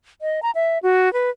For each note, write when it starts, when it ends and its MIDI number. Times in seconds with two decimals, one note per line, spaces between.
0.22 0.40 75
0.43 0.51 82
0.55 0.78 76
0.83 1.12 66
1.13 1.30 71